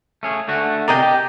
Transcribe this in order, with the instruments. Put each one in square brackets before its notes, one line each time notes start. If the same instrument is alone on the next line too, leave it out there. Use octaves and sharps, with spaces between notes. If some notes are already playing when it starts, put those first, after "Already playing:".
[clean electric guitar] A3 C#4 G#4
D3 A3 F#4
[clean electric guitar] C3 G#4 D5 [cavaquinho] A#4 D#5 G5
[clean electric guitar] G4